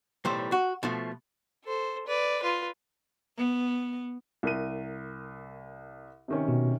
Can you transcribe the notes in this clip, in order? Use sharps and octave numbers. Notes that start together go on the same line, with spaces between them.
B1 A2 E3 G3 C5
F#4
B2 F3 A3
A4 C5
B4 D5
F4 B4
B3
C2 A#4 D#7
C3 D#3 C#4
B2